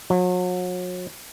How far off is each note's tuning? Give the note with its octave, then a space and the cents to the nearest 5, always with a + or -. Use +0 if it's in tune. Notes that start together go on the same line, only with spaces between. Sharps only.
F#3 -35